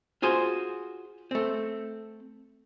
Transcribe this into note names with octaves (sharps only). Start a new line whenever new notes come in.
F4 F#4 G#4 C5
A3 C4